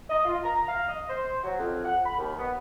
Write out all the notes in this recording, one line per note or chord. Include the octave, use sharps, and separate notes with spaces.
D#5
F4
A#5
F5
D#5
C5
F#3
F2
F#5
B5
D#2
B3